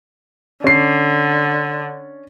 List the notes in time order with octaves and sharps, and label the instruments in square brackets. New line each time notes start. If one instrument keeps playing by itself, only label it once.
[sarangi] D3 [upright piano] C#4 C7